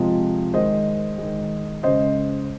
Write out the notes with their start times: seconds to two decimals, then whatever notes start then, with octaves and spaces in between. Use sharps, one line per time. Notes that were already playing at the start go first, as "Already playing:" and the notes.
Already playing: C3 F3 G#3
0.54 D#3 G#3 C5 D#5
1.18 D#3 G#3
1.83 C#3 G#3 C5 D#5